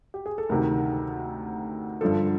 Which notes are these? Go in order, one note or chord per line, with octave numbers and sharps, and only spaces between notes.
G4
G#4
A4
D2 C3 D#3 A#4
G2 D3 F3 A4